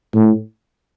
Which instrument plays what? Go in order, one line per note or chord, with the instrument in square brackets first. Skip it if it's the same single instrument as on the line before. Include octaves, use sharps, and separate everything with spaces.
[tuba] A2